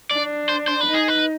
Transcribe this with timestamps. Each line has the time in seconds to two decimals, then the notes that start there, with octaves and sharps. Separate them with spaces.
0.11 D4 D5
0.49 C5
0.68 C5
0.81 B4
0.86 D#4
0.94 G#4
1.08 B4